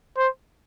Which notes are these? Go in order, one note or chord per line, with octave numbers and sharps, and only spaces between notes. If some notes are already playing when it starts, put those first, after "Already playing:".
C5